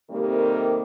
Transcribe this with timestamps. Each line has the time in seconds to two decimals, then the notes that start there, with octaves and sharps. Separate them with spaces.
0.10 C3 D#3 G3 A3 A#3 C4